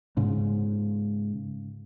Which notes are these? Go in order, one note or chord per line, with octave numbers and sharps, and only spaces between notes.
G#2 C#3